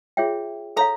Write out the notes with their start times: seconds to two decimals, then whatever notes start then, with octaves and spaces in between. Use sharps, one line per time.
0.17 F4 G#4 C#5 E5 G5
0.77 A4 C#5 F5 A#5